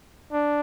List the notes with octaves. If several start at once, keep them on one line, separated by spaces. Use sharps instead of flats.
D4